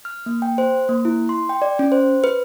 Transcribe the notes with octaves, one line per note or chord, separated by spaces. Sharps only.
F6
A#3
G5
C5
A#3
E4
C6
G5
D5
C#4
C5
B4